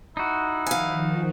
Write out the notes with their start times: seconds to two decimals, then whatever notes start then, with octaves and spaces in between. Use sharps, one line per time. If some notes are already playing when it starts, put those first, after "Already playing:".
0.17 D#4 E4 F#4
0.67 D#3 F3 F5 G#5